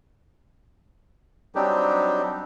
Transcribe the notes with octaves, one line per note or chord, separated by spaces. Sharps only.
F#3 G3 C4 D4 D#4 G4